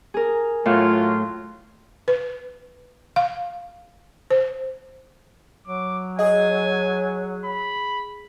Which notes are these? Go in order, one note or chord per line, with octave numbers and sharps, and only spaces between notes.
G#4 A#4
A2 F#3 F4
B4
F5
C5
F#3 D6
G#4 D#5 G#5
B5